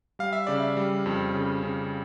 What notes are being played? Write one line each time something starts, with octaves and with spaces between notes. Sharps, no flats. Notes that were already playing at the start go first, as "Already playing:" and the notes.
G3 F5
E5
C#3 D5
E5
G3
F2
C#3
C#3